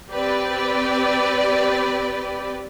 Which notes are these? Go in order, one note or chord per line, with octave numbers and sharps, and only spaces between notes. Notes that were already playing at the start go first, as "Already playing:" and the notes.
C4 G4 B4 D5